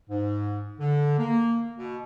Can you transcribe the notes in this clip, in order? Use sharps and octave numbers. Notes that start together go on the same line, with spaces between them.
G#2
D3
A#3
B2